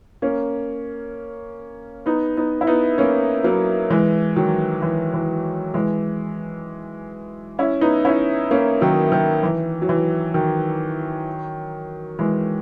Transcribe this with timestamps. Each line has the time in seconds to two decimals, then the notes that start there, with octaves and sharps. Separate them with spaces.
0.22 A#3 C#4
2.06 B3 D#4
2.37 B3 D#4
2.61 E4
2.67 B3 D#4
2.98 A#3 C#4
3.44 F#3 A#3
3.90 E3 G#3
4.36 D#3 F#3
4.82 E3
5.14 E3
5.74 E3 G#3
7.59 C#4 E4
7.81 B3 D#4
8.05 C#4 E4
8.51 A#3 C#4
8.81 D#3 F#3
9.12 D#3
9.43 E3
9.82 F#3
9.89 E3
10.34 D#3 F#3
12.19 E3 G#3